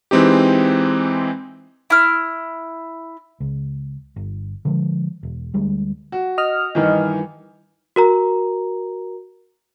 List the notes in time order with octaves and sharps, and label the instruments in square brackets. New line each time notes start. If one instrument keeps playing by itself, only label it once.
[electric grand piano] E3 G#3 C4 D#4 G4
[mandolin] E4 F6
[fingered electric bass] C#2
G1
D3 F3 G#3
E1
D2 G3 G#3
[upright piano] F#4
[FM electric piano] D#5 F6
[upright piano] G2 D#3 E3
[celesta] F#4 A#4 A#5